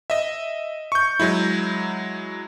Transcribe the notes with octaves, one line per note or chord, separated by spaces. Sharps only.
D#5 E5
C#6 G6
F#3 G#3 E4